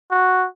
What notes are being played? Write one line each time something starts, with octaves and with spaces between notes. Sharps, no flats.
F#4